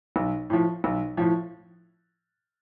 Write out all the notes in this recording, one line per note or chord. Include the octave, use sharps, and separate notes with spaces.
B1
A2 F3
B1
A2 F3